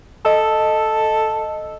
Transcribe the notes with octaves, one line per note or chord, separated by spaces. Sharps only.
A4 D#5 E6